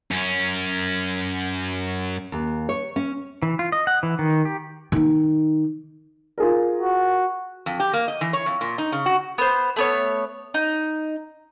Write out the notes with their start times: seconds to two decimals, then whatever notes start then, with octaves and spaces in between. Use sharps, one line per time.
0.11 F#2 C#4
2.32 D#2
2.69 C#5
2.96 C#4
3.42 E3
3.59 F4
3.72 D#5
3.87 F#5
4.03 E3
4.19 D#3
4.45 G4
4.92 D#3 D#4
6.38 F4 G#4 A#4
6.81 F#4
7.66 F2
7.80 G4
7.93 A#3
8.08 D#5
8.21 E3
8.33 C#5
8.46 F2
8.61 A#2
8.78 D#4
8.92 C#3
9.06 F#4
9.38 B3 C5
9.76 A3 B3 C#5
10.54 D#4